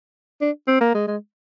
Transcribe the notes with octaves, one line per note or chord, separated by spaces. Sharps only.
D4
C4
A#3
G#3
G#3